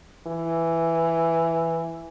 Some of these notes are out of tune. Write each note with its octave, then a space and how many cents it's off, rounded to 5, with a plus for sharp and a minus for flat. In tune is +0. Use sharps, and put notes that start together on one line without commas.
E3 +5